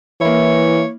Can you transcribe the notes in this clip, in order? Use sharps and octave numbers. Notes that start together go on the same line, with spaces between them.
E3 A#3 E4 C#5